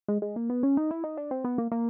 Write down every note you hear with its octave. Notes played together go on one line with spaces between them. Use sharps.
G#3
G#3
A#3
B3
C#4
D#4
E4
D#4
D4
C4
B3
A#3
A#3